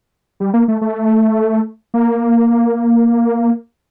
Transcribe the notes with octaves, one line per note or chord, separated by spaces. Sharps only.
G3
A#3
A3
A3
A#3